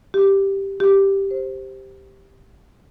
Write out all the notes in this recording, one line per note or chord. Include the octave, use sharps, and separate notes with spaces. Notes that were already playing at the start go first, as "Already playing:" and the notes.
G4
G4
C5